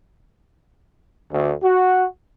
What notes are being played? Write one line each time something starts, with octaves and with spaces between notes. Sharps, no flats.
D2
F#4